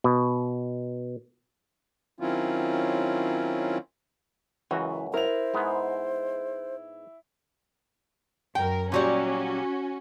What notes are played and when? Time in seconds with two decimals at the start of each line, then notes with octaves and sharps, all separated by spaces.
0.04 B2
2.20 D#3 F#3 C4 C#4 E4 F4
4.71 C#2 F#2 E3 F#4
5.14 E4 A#4 C5 F7
5.54 G#2 G#3 B3
8.55 F#2 A#4 G5
8.92 A#2 F#3 G3 C#4 F#4